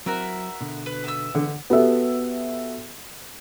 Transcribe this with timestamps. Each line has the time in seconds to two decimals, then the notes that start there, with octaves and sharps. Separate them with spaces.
0.06 F#3 C4 E4 F#4 A#4 E5
0.61 B2 D3
0.86 B4
1.04 B3 E5 E6
1.35 D3
1.70 B3 F#4 G4 A4 E5